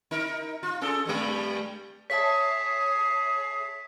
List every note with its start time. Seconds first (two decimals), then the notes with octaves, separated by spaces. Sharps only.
0.11 D#4 A#4
0.63 F4
0.81 C#4 G#4 A4
1.05 G2 G3 G#3
2.10 G#4 C#5 E5 A5 B6